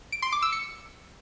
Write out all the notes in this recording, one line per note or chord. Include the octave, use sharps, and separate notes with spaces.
D7
C6
D6
E6
C#7